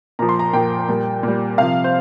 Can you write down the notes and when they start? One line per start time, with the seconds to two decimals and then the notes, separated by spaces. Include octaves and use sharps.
0.19 A#2 F3 A#5
0.29 C6
0.39 A#5
0.53 A#2 F3 G5
0.89 A#2 G3
1.23 A#2
1.28 G3
1.58 C3 F3 F5
1.84 C5